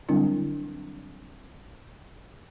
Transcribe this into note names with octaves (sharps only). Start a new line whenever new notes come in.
D3 F#3 G3 C4 D4 E4